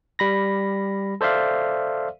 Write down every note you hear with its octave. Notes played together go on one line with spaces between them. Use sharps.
G3 B5 A#6
A4 C5 D5 E5 F5